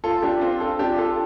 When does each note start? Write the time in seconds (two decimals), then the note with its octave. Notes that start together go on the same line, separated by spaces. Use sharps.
0.04 F4 A4
0.22 D4 G4
0.41 C4 F4
0.60 F4 A4
0.79 D4 G4
0.98 F4 A4